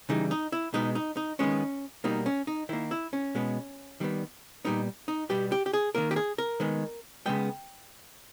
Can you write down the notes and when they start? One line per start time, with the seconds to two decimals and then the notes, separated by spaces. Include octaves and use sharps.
0.09 C#3 E3 G3 D#4
0.31 D#4
0.52 E4
0.74 B2 G#3 B3 D#4
0.95 D#4
1.17 D#4
1.39 D#3 G#3 B3 C#4
2.04 B2 G3 A#3 D#4
2.26 C#4
2.47 D#4
2.69 D#3 A#3 E4
2.91 E4
3.13 C#4
3.35 B2 G#3 B3
4.00 D#3 G3 B3
4.65 A#2 G3 B3 D#4
5.08 D#4
5.29 B2 G3 B3 G4
5.52 G4
5.66 G4
5.73 G#4
5.95 D#3 A#3 A#4
6.11 G4
6.16 G#4
6.38 A#4
6.60 D#3 G#3 B3
7.26 C#3 G#3 B3 G5